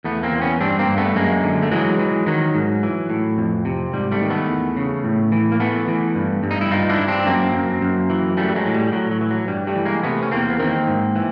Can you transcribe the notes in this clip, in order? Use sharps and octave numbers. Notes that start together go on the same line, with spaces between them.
E2 A3 B3
A#3 C4
E2
B3 C#4
G2 C4 D4
A#3 C4
G2
A3 B3
F#2 G#3 A#3
D3
A3
E3 F#3 G#3
E3
D#3 F#3
G#2
E3
A2
F2
C3
G#2 G3
G3 A3
D#3
A3 B3
E2
C#3
A2
E3
A#3
E3 A3 B3
E3
G2
G2
D#4
E4
G2 D#4 F4
D4 E4
G2
C4 D4
F#2 A#3 C4
F#2
F#2
E3
E3 G3 A3
F#3 G#3
A2
G3
G3
A2 F#3
F#3
E3
F#3
G2 G3
G3 A3
E3
G#3 A#3
C3 A3 B3
C#4
E2 A#3 C4
B3
D#3 A#3 C4
G#2
E3